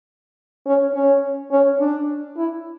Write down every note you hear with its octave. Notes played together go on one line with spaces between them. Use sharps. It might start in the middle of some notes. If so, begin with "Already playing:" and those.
C#4
C#4
C#4
D4
E4